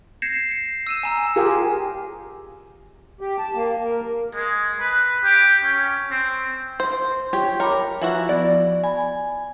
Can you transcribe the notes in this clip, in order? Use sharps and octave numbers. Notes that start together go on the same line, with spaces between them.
G6 G#6 A#6 C7 C#7 E7
C#7
E6 D#7 E7
G#5 A#5 E6
F4 G4 G#4 A#4
G4
A5
A#3
A#4
G#3
B4
G4
C#4
C4
C5 C6
G4 C#5
A#4 C#5 A#5 B5 D6
E3 F3 E4 F#4
B3 D5
G#5 B5